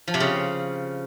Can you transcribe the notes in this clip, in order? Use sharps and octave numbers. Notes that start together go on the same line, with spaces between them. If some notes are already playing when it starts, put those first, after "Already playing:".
F3
C3
C#3